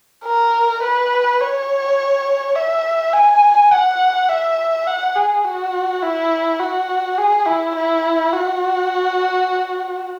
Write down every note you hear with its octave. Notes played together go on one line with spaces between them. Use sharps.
A#4
B4
C#5
E5
G#5
F#5
E5
F#5
G#4
F#4
E4
F#4
G#4
E4
E4
F#4